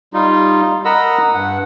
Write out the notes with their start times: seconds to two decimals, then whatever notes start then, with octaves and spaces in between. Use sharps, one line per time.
0.14 G3 D#4 F4
0.85 A#4 D#5 F#5 A#5 B5 E6
1.34 G2 F#5